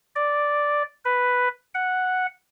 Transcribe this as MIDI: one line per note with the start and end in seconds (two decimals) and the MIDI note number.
0.15 0.83 74
1.05 1.48 71
1.74 2.26 78